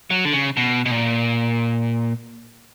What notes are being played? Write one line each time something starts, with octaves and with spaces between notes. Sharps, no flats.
F#3
D3
C#3
B2
B2
A#2